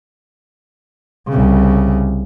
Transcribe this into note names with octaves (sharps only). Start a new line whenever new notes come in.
C2 C#3